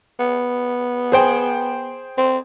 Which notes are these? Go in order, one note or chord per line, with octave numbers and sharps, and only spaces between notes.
B3
G#4 C5 G5
C4